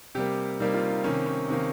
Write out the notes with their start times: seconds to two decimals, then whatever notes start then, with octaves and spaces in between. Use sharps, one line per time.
0.15 C3 G3 A#3 G4
0.60 C3 G3 A#3 D#4
0.74 F4
0.90 D#4
1.04 C3 D#3 A#3 C#4
1.26 C#4
1.48 C3 D#3 A#3